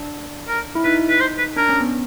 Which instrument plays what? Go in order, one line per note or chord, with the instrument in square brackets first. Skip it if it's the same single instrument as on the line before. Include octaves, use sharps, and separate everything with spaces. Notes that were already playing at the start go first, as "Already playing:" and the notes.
Already playing: [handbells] D4
[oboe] A#4
[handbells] E4
[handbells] D#4 [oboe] B4
[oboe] B4
C5
B4
[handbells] D4 [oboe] A#4
[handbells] C#4
B3